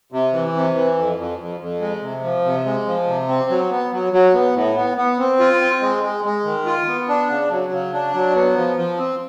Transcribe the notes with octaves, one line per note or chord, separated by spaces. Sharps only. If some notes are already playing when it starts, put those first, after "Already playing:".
C3
E3
C3
E3
F2
F2
F2
F2
G#3
C3
F3
C3
G#3
F3
C3
C4
F#3
B3
F#3
F#3
B3
A2
B3
B3
C4
F4
C4
G#3
G#3
G#3
D#3
F4
B3
D4
C#3
F#3
C#3
D4
F#3
B3
F3
F3
C4